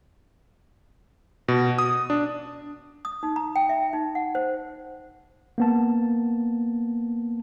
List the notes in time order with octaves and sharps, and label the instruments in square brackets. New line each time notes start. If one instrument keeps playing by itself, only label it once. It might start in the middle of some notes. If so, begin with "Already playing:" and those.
[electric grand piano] B2
D#6
D4
[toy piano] D#6
D#4
A#5
G5
E5
D#4
F#5
C5
[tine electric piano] A#3 B3 A5